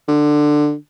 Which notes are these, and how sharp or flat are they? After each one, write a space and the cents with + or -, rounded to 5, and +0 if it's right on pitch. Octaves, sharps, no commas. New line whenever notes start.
D3 +15